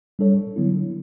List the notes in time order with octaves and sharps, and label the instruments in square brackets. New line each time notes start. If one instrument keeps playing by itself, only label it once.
[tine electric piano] G3 D4 A4 C#5
D3 F#3 B3 E4